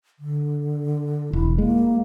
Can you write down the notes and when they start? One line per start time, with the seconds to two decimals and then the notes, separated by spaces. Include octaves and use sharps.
0.19 D3
1.33 E1 E4
1.58 G#3 A#3